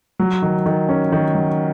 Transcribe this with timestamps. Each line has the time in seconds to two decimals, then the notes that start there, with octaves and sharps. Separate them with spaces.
0.19 F#3
0.42 D#3
0.66 D#3
0.89 C#4
1.12 D#3
1.35 F#3